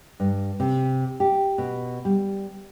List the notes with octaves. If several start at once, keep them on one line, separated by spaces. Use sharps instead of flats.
G2
C3
G4
B2
G3